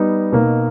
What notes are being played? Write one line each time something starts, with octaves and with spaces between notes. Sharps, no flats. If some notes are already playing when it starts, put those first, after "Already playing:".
Already playing: G3 B3 D#4
B2 A#3 D#4